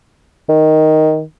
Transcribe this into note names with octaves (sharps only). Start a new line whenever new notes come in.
D#3